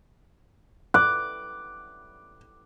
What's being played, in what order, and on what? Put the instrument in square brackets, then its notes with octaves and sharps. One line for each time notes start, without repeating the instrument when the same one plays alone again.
[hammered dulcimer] D6 [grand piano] F#6